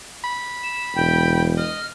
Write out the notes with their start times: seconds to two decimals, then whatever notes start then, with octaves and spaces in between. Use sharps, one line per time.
0.24 B5
0.63 E7
0.95 E1 G5
1.57 D#5 F6